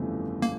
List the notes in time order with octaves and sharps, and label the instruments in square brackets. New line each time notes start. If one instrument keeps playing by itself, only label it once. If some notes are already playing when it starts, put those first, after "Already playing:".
Already playing: [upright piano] G1 F2 C#3 E3 A3
[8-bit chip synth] A#3